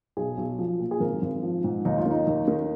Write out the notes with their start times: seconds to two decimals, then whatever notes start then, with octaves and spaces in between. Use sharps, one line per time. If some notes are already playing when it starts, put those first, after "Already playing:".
0.17 B1 G#4
0.37 B1
0.59 F3
0.79 A#2
0.91 G#4
1.00 G#1 A#4
1.22 G#1
1.43 F3
1.64 G#2
1.85 D#2 D#4
1.98 F4
2.06 D#3
2.11 D#4
2.27 D#2
2.48 D#3